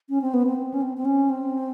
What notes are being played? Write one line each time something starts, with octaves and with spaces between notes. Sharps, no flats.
C#4
C4
B3
C4
C#4
C4
C4
C#4
C4